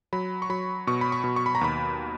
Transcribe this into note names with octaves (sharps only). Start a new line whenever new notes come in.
F#3 B5
C#6
F#3 B5
B2 C#6
B5
C#6
B2
C#6
B5
A#5
D#2 B5